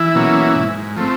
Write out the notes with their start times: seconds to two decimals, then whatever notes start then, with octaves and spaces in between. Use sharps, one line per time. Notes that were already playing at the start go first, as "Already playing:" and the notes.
Already playing: E3 E4
0.15 B2 F#3 A#3 C#4
0.55 G#2
0.96 F3 A3 C4